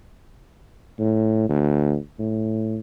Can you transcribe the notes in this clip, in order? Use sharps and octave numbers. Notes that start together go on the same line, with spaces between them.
A2
D2
A2